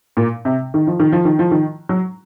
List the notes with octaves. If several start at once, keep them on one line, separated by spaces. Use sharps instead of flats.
A#2
C3
D#3
F3
D#3
F3
D#3
F3
D#3
F#3